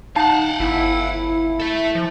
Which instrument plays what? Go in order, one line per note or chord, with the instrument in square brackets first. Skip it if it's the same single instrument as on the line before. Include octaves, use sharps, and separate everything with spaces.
[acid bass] D#4 [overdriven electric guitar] F5 F#5 [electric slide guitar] A5
[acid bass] G1 [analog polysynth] E4
[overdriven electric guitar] A4 E5
[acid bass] F3